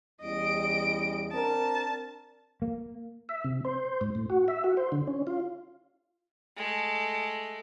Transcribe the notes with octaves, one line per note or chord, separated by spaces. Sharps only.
E2 G3 C#4 D#5 D7
C4 D4 A#4 A5
A#3
E5
C3
C5
G#2
A2
F#4
E5
F#4
C5
D3
C#4
F4
G#3 A3